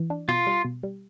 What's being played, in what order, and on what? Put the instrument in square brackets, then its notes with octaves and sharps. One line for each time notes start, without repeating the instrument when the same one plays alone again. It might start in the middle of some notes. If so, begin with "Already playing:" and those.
Already playing: [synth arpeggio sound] E3
D4
[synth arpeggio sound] B2 [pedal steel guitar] F4
[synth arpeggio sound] G3
B2
G3